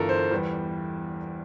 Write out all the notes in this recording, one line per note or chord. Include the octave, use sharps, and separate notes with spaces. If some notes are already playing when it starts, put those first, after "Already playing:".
Already playing: G1 G2 E3 F4 A4 A#4
C5
E2 E3 G3